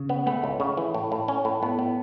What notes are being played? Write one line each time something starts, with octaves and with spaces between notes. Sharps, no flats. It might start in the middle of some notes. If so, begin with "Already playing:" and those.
Already playing: C#3
B3
A3 B3
C#2
C#3
E3
A2
A2
C#4
A2
A2 B3
A2